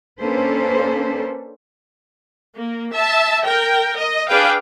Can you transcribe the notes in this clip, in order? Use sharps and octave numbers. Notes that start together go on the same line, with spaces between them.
A#3 C#4 D4 A4 B4 C5
A#3
E5 A5
A#4 G5
D#5
D4 G#4 B4 F5 G5